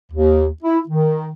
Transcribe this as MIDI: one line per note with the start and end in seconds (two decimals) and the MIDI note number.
0.12 0.46 39
0.63 0.79 64
0.88 1.29 51